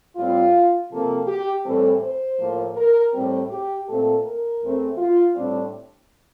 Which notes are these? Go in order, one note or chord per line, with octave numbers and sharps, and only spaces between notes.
A2 G3 C4 F4
C3 F3 A#3 A4
G4
A2 E3 G3 C4 A4
C5
A2 F3 A#3
A#4
A2 G3 C4 G4
G4
A#2 A3 C4 A4
A#4
E2 E3 A3 C4
F4
A2 G3 C4 D4